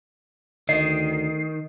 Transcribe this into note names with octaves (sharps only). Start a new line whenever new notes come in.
D2 D#3 D#5 C7